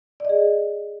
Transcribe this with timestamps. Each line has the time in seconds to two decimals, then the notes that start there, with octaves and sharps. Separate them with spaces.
0.20 D5
0.25 D#5
0.29 G#4